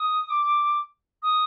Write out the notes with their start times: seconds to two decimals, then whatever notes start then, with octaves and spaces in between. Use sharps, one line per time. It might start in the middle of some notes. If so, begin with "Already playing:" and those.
Already playing: D#6
0.30 D6
1.22 D#6